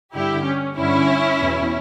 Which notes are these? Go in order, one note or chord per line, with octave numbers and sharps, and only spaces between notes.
G2 D3 E4 G4
C#4
G2 D3 C#4 E4
E2 B2